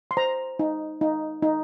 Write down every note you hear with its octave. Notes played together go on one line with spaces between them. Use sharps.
C6
C5 A#5
D#4
D#4
D#4